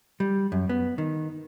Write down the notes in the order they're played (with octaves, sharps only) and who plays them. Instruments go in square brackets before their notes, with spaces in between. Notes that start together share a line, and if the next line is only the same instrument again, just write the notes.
[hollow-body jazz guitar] G3
F#2
B3
D#3